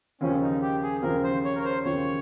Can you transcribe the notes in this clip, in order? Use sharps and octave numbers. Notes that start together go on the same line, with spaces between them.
D#2 C#3 F3 C#4
D#4
G4
G#4
D#2 C#3 F3 A#4
C5
C#5
A#4
C5
D#2 C#3 F3 C#5